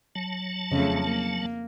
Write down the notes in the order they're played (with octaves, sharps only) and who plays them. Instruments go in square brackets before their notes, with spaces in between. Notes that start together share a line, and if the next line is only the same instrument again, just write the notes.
[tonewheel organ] F#3 A5
[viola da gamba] F2 A3 [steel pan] C#3
[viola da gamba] A#3